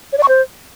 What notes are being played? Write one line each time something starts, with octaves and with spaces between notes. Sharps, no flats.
C#5
D5
C#6
C5